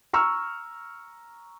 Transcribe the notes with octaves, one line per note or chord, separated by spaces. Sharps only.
A#5 C#6 E6 F6